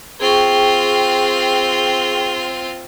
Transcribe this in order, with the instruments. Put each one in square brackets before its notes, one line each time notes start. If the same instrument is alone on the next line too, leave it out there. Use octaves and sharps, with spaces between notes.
[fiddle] C4 F4 [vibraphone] G#4 G5 C#6